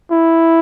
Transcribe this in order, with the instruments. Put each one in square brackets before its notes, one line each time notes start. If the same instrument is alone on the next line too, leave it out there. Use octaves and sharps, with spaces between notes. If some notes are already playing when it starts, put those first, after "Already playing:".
[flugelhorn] E4